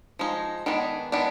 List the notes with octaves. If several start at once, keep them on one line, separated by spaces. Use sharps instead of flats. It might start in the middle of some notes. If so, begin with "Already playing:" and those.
F3 G#3 D#4
D#3 G#3 B3 D4
D#3 G#3 B3 D4